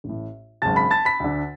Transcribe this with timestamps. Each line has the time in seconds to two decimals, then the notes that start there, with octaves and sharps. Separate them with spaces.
0.04 A1
0.09 A2
0.62 G#1 F#2 C#3 A5 A6
0.76 B5 B6
0.91 A5 A6
1.05 B5 B6
1.20 D2 D3